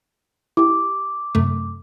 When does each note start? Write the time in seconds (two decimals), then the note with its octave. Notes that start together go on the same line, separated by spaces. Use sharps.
0.57 E4 G4 D6
1.35 F#2 C3 A3